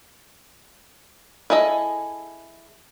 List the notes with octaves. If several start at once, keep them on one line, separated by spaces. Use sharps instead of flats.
E4 G#4 A4 D#5